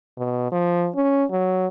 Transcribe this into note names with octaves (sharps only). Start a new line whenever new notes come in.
B2
F3
C#4
F#3